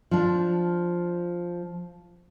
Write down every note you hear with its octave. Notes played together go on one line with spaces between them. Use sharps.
F3 D4